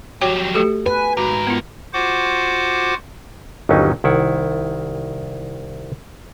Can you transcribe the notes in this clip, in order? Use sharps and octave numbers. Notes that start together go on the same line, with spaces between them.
F#3 G3 F#4 C#5 G5
A3 G4 A4
B4 G#5
G#2 F#4 A#4
B3 F4
F4 F#4 C5 F#5 D6
G1 D#2 D#3 F#3 C#4 D#4
C2 D#3 E4 F#5